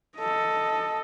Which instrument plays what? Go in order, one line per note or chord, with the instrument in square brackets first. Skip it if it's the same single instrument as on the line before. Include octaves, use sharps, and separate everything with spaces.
[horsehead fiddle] A4 D#5